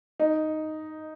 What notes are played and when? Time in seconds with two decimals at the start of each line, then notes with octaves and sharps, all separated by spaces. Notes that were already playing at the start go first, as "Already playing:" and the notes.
0.20 D#4